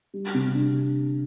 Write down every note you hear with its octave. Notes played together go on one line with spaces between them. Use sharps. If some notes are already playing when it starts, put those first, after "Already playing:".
G3
C3
D4